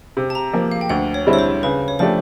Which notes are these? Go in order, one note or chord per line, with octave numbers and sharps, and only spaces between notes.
C3
A5
A#5
F3 A#3
F5
G5
D2 F#5
C#5
D3 G3 C4 E4
C#5
C5
C#3 B4
C#5
F3 A3 D4 G4 C5